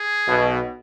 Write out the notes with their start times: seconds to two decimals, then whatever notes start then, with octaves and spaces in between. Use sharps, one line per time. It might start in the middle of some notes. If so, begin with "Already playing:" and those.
Already playing: G#4
0.27 B1 B2